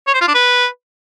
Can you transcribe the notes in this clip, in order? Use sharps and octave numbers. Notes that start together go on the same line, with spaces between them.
C#5
C5
F4
D4
B4